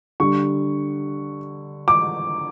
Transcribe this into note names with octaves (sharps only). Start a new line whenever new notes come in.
D3 G3 C#6
D6